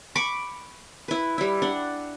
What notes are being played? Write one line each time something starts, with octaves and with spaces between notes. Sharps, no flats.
B5 C#6 D6
E4 B4
G3 E4
D4 F#5